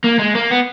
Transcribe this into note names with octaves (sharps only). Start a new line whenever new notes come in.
A#3
G#3
A#3
B3